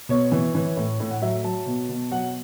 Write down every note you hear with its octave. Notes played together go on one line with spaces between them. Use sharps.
B2 C#5
E3
E3
A2
A2
F#5
F#3 E5
F#3 A5
B2
B2
F#3 F#5